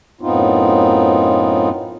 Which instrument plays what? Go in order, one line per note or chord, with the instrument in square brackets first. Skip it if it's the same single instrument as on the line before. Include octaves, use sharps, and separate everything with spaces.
[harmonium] F#2 A2 B3 C4 D#4 F4